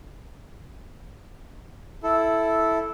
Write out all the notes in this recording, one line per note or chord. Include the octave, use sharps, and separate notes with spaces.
E4 A4